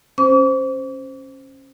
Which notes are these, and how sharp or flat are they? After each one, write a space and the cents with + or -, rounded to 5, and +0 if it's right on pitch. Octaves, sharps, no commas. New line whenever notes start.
C#4 -20 C5 -5 D6 -40